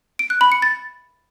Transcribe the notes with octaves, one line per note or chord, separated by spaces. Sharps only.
D7
F#6
B5
C#7
A6